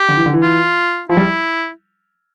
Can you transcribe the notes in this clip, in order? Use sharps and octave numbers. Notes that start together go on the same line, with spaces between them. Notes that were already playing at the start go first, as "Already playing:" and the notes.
Already playing: G4
D3
E3
D3
E3
F4
F3 E4
G3